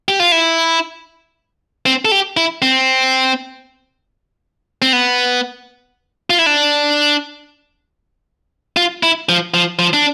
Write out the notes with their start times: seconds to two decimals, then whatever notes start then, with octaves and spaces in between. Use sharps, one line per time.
0.08 G4
0.20 F4
0.32 E4
1.86 C4
2.05 A4
2.12 G4
2.37 E4
2.62 C4
4.82 C4
4.93 B3
6.30 F4
6.39 E4
6.46 D4
8.77 F4
9.03 E4
9.29 F3
9.54 F3
9.79 F3
9.93 D4